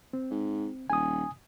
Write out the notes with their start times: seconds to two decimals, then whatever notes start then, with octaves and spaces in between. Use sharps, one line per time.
0.13 C4
0.31 G#2
0.90 D#1 G#5 D#6